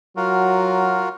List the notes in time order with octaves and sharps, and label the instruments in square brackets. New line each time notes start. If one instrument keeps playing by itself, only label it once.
[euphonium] F#3 [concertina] F4 F#4 A#4